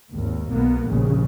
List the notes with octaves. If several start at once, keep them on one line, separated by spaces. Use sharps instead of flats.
G#1 D#2
B1 A#3 B3
A#1 D#2 C#3